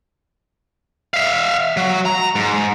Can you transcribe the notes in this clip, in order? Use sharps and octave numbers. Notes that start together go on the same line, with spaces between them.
E5 F5
F#3
A#5
G#2